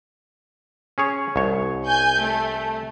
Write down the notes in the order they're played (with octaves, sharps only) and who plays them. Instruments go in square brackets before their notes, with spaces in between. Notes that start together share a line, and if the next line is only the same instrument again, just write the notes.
[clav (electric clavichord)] C#4 G#4 C#5
C2 C#5
[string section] G#5 G6
A3